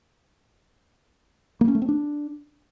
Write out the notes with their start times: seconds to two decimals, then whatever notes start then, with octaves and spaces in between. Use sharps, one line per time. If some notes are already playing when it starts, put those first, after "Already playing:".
1.61 A#3
1.68 C#4
1.75 A3
1.82 C4
1.89 D4